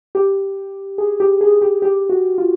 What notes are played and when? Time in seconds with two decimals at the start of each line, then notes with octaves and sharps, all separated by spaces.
0.15 G4
0.98 G#4
1.20 G4
1.41 G#4
1.62 G4
1.82 G4
2.09 F#4
2.38 F4